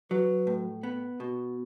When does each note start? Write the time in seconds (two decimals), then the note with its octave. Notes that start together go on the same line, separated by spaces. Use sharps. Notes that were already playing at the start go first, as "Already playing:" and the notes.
0.11 F#3 B4
0.47 A2
0.83 B3
1.20 B2